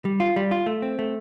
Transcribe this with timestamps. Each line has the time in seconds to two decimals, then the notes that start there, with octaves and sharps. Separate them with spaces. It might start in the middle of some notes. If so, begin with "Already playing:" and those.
0.05 G3
0.20 F4
0.36 G3
0.51 F4
0.66 A3
0.82 C4
0.99 A3